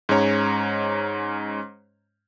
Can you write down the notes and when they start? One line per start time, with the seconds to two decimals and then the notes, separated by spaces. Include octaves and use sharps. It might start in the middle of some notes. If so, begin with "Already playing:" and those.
0.09 G#2 G#3 C#4 C#5 A#5